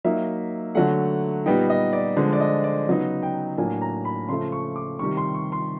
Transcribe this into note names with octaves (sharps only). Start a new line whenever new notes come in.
F#3 A#3 D#4 E5
D3 F#3 A3 F#5
A#2 G3 B3 D#4 G5
D#5
D5
D3 F3 G#3 C5
D5
D#5
D5
C#3 F#3 B3 D#4
G5
A2 F#3 A#3 D4 G#5
A#5
B5
C#3 F3 A3 C6
C#6
D6
C3 D#3 G3 C#6
C6
C#6
C6